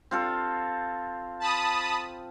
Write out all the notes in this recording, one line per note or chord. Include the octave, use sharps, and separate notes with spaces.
C4 F4 A4
A5 B5 D#6